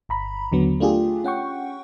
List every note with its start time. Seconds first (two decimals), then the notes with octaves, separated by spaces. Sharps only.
0.09 G1 A#5 B5
0.52 D#2 D3 F#3 B3
0.80 A3 D4 F4 G4 G#4
1.24 C#4 F#5 G5 C#6